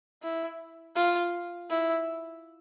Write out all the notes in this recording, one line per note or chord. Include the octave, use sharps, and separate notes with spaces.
E4
F4
E4